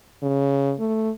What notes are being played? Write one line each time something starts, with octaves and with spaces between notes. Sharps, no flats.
C#3
A3